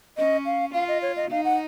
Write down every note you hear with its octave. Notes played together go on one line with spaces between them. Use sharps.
C#4 D#5
F5
F4 F5
D#5
C#5
D#5
D#4 F5
F#5